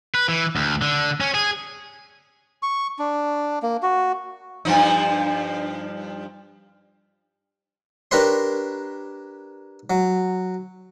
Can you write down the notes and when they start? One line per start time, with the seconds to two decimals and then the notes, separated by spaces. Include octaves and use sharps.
0.15 B4
0.28 E3
0.56 D2
0.82 D3
1.20 C#4
1.34 G#4
2.63 C#6
2.99 D4
3.63 A#3
3.83 F#4
4.65 G2 F3 D#4
8.11 D4 G4 A#4 B4 C#5 C6
9.90 F#3